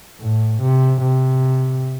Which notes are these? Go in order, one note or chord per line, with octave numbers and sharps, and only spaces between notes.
A2
C3
C3